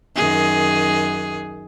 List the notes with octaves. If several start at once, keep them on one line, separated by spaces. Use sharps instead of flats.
F#2 D#3 G#4